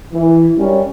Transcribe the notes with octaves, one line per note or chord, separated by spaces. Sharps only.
E3
F#2 G3 C#4